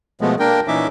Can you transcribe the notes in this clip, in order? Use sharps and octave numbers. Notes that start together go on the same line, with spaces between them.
B2 F3 G#3 A3 B3
A#3 D4 A#4 G5
A#2 E3 C#4 D#4 E5 D6